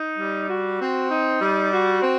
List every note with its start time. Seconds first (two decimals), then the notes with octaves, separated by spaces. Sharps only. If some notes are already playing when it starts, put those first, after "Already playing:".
Already playing: D#4
0.18 G3
0.48 F#4
0.79 C4
1.10 D#4
1.40 G3
1.71 F#4
2.02 C4